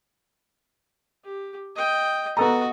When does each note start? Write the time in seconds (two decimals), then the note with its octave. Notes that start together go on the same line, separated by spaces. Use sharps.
1.25 G4
1.76 D#5 G5
2.37 B3 F#4 A4 D#5 A#5